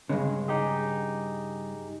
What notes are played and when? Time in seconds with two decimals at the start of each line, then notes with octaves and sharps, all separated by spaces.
0.09 G2 C#3 G#3
0.48 D#4 G4 G#4